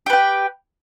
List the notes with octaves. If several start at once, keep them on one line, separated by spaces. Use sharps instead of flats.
G4 B4 G5